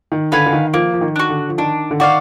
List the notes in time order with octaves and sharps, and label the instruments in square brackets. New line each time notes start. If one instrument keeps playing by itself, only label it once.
[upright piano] D#3
[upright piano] D3 [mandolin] B4 F5 G#5
[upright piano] D3
D#3
[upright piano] F3 [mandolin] A#3
[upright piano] F3
D#3
[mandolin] D4 F#4
[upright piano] D3
F3
[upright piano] D#3 [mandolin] D4
[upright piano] D3
[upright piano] D#3 [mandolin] F#4 D5 F5